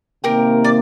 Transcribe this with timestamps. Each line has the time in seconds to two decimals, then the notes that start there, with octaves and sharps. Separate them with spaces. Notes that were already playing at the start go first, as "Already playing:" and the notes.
0.23 C3 D#3 A#3 G4 A#4
0.64 D5